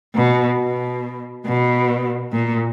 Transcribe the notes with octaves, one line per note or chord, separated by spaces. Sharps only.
B2
B2
B2
A#2